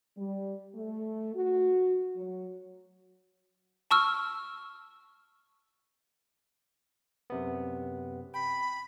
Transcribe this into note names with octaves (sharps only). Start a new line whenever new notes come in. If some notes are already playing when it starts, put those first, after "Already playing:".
G3
A3
F#4
F#3
A5 C#6 E6 F6
F#2 C3 B3
G5 B5